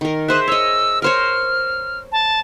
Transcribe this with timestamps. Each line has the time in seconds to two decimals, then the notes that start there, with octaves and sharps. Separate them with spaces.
0.01 D#3 A#4
0.28 G#4 C5 E5 F#6
0.48 C#5 D#5 E6
1.02 A#4 C5 C#5 F6
2.12 A5